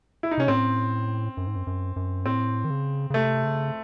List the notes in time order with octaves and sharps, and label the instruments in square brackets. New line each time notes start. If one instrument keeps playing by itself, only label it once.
[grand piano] E4
D#4
[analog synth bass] C3 [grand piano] C#4
[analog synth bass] A2 [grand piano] C4
[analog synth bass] F#2
G#2
F#2
F#2
F#2
[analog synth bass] A2 [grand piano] C4
[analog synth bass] D#3
C#3
C#3
[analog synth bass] C3 [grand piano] A3
[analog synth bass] C#3